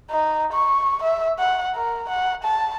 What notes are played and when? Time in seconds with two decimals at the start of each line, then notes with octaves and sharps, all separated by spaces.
0.10 D#4
0.53 C#6
1.03 E5
1.39 F#5
1.75 A#4
2.09 F#5
2.44 A5